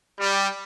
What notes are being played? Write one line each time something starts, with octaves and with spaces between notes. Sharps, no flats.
G3